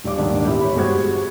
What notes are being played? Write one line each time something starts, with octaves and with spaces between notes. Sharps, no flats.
D#1 D5 D6
D#1 G#2 D#3 D4 D5
E2 E4 G4
C#5 B5
G1 G#3 F#4 G4 C5 G#6